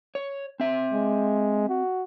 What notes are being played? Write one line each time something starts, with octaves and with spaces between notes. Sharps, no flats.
C#5
C4 E5
G#3
F#4